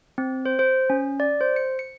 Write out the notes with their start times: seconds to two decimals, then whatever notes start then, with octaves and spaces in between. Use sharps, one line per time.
0.18 C4
0.46 C5
0.59 C5
0.90 C#4
1.20 D5
1.41 C5
1.56 C#7
1.79 C#7